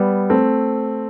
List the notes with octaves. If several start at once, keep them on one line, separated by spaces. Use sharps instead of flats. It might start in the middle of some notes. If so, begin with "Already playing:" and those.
Already playing: G3 B3
A3 C4